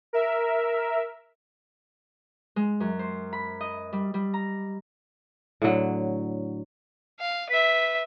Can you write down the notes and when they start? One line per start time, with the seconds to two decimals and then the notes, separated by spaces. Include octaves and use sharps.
0.13 A#4 E5
2.56 G#3
2.80 F#2
2.99 C5
3.33 B5
3.61 D#5
3.93 G3
4.14 G3
4.34 A#5
5.62 A2 D3 F#3
7.20 F5
7.50 B4 E5 B6